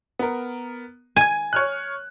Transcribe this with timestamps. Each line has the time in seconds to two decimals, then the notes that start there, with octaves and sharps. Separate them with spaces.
0.19 B3 A#4
1.16 G#5 G#6 D#7
1.53 C#5 F6 F#6